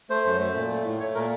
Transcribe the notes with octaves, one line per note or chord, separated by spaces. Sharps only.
A3 C5
F#2
A3
A#2
A3
A2
A3 C#5
A#2 A#4